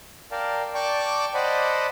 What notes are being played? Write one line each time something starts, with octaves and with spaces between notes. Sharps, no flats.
A#4 D5 F5 G5 A5
D5 G5 A5 C#6 D6
C5 D5 D#5 F#5 A5 B5